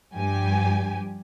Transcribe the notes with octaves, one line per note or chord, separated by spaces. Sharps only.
G2 F3 G4 G#5